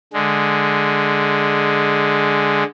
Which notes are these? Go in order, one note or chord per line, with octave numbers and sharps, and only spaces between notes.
D3 G#3